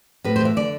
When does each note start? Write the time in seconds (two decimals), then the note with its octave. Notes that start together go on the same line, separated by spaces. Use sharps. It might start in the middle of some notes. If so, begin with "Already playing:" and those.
0.24 A2 B4
0.36 C5
0.41 E3 E5
0.56 D3 D5